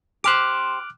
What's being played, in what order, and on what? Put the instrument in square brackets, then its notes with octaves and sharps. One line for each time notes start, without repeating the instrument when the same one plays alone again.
[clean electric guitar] G4 C5 [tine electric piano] D6 F6 F#6